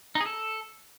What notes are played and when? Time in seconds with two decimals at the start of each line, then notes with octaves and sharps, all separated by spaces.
0.15 D#4
0.21 G#4
0.26 A4